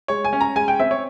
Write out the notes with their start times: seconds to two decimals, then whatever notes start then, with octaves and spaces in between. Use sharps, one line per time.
0.08 G#3 C#5
0.25 G#5
0.33 C#4
0.41 A#5
0.56 G#3 G#5
0.68 G5
0.80 C4 E5
0.91 C#5